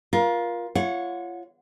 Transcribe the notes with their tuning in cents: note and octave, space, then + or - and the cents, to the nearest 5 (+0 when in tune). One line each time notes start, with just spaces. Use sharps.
F4 +0 A#4 +30
F4 -30 C#5 +0 F#5 -30